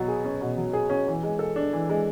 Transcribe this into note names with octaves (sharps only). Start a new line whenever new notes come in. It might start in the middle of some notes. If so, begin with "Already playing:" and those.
Already playing: B2 F#3
G#4
C#4
B2
F#3
G#4
C#4
E3
G#3
A4
D4
E3
G#3